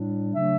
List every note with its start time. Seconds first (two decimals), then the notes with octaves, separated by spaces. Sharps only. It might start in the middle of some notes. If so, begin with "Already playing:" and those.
Already playing: A2 G3 D4
0.35 C#3 F#3 A3 D4 E5